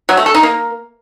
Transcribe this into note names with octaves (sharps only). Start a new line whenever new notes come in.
F#3
A3
A4
D#4
A#3